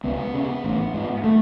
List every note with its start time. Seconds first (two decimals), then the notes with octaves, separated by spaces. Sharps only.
0.04 C#2 B3
0.34 C#3
0.64 A1
0.94 G#2
1.24 A3